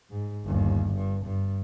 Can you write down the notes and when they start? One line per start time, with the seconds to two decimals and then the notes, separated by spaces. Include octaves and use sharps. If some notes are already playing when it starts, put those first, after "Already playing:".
0.10 G#2
0.45 G1 D#2
0.95 G2
1.25 G2